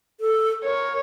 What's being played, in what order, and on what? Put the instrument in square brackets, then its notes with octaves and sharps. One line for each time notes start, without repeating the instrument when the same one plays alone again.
[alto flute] A4
[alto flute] A#4 [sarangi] C#5